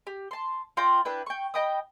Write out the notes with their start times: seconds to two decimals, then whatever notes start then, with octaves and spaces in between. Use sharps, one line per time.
0.07 G4
0.31 A5 C6
0.77 F4 D5 G5 A#5
1.05 D4 E4 B4 G5
1.26 G5 C#6
1.54 D#5 G5 B5 D#6